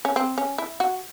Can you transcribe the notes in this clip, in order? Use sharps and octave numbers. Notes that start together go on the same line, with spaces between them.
C#4
C4
C#4
E4
F#4